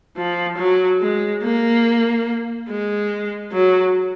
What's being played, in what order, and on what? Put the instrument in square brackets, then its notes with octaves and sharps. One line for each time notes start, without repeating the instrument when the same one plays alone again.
[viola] F3
F#3
G#3
A#3
G#3
F#3